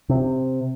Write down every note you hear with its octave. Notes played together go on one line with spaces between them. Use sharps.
C3